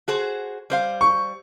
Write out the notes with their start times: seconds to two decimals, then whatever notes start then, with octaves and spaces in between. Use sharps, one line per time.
0.08 F#4 G#4 C5
0.70 G3 C5 F5
1.01 C#6